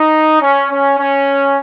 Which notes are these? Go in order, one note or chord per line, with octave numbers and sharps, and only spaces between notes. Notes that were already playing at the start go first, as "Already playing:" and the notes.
Already playing: D#4
C#4
C#4
C#4